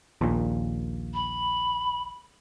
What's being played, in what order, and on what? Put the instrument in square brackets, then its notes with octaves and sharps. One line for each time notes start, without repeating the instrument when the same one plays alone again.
[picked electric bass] A#1 D#2 A#2
[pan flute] B5